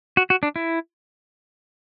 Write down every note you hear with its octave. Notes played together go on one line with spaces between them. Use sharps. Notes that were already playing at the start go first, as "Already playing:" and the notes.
F#4
F#4
D4
E4